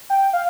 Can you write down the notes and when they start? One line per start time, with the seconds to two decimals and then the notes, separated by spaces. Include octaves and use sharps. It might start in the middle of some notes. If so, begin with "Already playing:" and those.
0.10 G5
0.33 F5